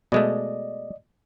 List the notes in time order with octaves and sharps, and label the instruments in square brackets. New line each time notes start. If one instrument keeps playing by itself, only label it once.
[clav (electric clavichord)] B2 G#3 A3 [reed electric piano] D5 D#5